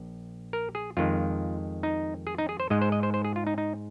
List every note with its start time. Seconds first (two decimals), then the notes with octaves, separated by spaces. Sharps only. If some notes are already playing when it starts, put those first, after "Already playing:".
Already playing: A#1
0.53 A#4
0.75 G#4
0.97 F2 D#3 G#3 F4
1.83 D#4
2.27 G#4
2.38 D#4
2.49 G#4
2.60 C5
2.70 G#2 G#3 D#5
2.81 C5
2.92 D#5
3.03 C5
3.14 C5
3.25 G#4
3.36 F4
3.47 D#4
3.58 D#4